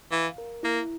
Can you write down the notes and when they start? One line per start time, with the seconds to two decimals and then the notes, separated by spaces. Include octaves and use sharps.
0.11 E3 F5
0.38 A#4
0.63 A#3 E4